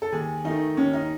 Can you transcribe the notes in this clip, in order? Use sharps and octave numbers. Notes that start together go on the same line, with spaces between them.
A4
D#2 G#4
D#3 A3 D#4
D#2 C#4
D#4